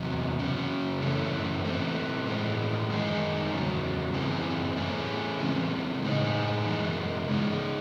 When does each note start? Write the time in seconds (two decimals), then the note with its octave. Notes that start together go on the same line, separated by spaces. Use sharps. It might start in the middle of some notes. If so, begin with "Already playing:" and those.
Already playing: E2 C3 F#3
0.39 C#3 F#3 C#4
1.00 F#2 E3 A3 C#4
1.64 E3 A3 C4
2.26 A2 E3 G#3
2.90 F#2 D#3 G#3 D#4 G#4
3.52 E2 C#3 F#3
4.14 F#2 E3 C4 E4 G#4
4.77 E3 A3 C#4 G#4
5.40 C#3 E3 G#3 C4
6.02 A2 G#3 D#4 G#4
6.66 F#2 E3 G#3
7.28 C#3 G#3 D#4 G#4